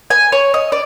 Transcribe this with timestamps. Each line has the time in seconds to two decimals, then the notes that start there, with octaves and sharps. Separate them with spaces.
0.10 G#5
0.32 C#5
0.54 D#5
0.72 D5